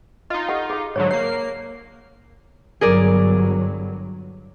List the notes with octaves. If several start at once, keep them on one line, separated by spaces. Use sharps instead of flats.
D#4 F4 D#5
G4 A4 F#5
G#4 F5
G#2 D3 F#3 C#5
A#3 C#5 C7
G1 G2 F#3 G#4 A#4 D5